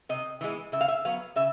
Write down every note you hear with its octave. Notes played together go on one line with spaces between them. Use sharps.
C3 D#5
E3 G#3 B3
C#3 E5
F5
E5
F#3 B3 F5
C#3 E5